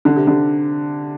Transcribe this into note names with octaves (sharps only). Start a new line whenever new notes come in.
D3
C3
D3